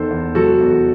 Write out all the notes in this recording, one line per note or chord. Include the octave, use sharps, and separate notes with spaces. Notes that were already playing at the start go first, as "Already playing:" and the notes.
Already playing: E2 D#3 A4 C5
E2
F#3 F#4 A4
E2